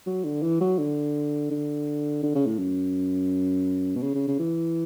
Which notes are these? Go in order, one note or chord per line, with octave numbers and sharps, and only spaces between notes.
F#3
D3
E3
F#3
D3
D3
D3
C#3
A2
F#2
B2
C#3
C#3
C#3
E3